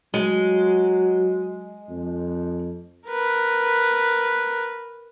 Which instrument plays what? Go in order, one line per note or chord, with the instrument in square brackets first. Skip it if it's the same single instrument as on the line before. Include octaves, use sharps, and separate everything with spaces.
[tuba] F#3 [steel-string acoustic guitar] G#3
[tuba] F2
[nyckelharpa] A#4 B4